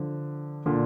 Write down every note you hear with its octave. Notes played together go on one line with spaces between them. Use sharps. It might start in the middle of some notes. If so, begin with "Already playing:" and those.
Already playing: D3 F3
A#2 D3